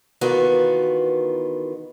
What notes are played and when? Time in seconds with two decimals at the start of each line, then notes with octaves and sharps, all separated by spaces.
0.21 D#3 E3 B3 F4 F#4